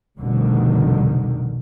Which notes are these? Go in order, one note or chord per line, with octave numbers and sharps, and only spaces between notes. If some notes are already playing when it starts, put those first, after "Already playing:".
F1 C2 F2 B2 D3 D#3